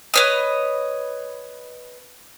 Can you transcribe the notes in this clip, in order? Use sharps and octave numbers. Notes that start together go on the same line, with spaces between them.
B4 C#5 D#5